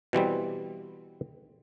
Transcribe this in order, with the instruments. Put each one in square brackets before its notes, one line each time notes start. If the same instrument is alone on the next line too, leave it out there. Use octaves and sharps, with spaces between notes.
[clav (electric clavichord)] B2 E3 G3 C4